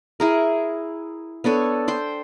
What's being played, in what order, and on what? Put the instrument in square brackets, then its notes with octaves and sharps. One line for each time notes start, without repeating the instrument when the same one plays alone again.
[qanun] E4 G#4 A#4
B3 D4 A4 C#5
C5 G5 C6